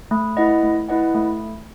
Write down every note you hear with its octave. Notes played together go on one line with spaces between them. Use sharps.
A3
E4 B4 D#5 F#5
A3
E4 B4 D#5 F#5
A3